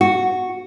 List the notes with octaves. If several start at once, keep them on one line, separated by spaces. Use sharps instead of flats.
F#4